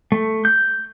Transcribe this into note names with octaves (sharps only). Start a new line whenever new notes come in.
A3
G6